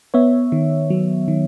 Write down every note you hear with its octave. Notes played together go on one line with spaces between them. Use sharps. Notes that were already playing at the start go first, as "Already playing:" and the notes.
B3 C#5 E5
D#3
F#3
D#3